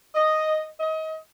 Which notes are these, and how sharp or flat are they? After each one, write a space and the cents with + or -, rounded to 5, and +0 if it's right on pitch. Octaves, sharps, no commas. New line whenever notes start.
D#5 +0
D#5 +30